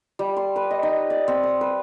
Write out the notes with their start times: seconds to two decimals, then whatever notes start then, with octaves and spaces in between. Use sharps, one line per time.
0.19 G3
0.37 C6
0.56 B4
0.71 D#5
0.83 D#4
1.10 D5
1.28 C4
1.43 D#6
1.61 B4